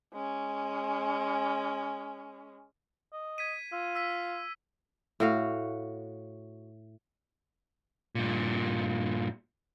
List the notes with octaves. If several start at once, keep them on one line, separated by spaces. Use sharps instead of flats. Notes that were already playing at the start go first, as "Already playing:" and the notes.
G#3 C#4
D#5
G#6 B6 D#7
F4 E6
E6 B6
A2 F#4 F5
G2 A#2